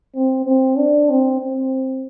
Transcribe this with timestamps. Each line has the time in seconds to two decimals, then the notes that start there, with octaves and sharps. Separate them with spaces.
0.15 C4
0.46 C4
0.78 D4
1.09 C4
1.41 C4